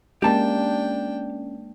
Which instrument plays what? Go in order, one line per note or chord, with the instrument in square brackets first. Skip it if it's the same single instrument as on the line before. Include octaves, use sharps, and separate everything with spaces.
[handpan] G#3 A#3 [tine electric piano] C#4 [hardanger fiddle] D4 G5 [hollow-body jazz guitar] G4 A5